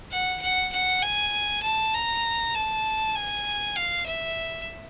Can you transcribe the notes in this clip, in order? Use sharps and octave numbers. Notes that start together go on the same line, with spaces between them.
F#5
F#5
F#5
G#5
A5
A#5
A5
G#5
F5
E5